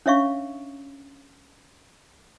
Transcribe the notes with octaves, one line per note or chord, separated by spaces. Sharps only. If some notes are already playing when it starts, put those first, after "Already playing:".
C#4 D4 C#5 E5 F5 C#6